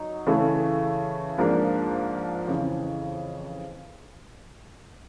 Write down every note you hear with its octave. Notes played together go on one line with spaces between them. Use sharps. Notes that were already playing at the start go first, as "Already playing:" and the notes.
Already playing: F#3 D#4
C#3 E3 A3
G#2 F3 A#3 D4
F2 C#3 E3